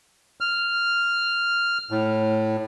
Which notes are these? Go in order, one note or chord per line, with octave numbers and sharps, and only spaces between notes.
F6
A2